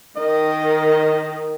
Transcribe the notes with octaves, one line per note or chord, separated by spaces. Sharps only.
D#3 D#5